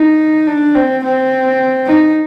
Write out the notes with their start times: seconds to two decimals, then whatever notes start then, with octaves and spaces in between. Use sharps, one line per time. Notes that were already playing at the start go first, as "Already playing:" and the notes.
Already playing: D#4
0.47 D4
0.75 C4
1.04 C4
1.87 D#4